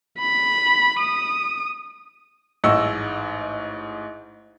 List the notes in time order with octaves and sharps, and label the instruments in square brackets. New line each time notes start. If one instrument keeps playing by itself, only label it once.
[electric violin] B5
D#6
[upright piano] A1 G#2 D#5 C#6 E6